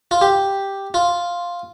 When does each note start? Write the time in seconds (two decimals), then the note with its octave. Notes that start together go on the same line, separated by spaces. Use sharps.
0.11 F4
0.21 G4
0.94 F4